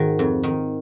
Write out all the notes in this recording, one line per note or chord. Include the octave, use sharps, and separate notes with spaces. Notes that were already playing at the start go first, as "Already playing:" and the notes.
Already playing: G#2 D#3 F#4
F2
D#3